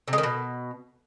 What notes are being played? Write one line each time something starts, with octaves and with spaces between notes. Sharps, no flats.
C3
G#3
D#3
B2